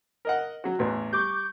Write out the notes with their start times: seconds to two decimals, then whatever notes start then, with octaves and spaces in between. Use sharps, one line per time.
0.25 A#4 D#5 F#5
0.64 F#3 F#4
0.79 A1 E2 B4
1.13 G3 C#6 D6 G6